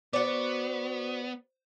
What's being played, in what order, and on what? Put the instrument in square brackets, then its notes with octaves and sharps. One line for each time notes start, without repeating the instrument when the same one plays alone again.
[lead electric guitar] B3 [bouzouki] F#4 D5 [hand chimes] C5